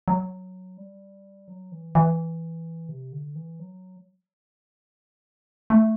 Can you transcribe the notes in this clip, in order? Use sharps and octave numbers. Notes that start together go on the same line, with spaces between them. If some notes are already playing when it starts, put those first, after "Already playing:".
F#3
G3
F#3
E3
E3
C3
D3
E3
F#3
A3